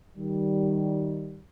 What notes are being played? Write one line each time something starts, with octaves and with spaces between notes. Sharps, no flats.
D#3 G3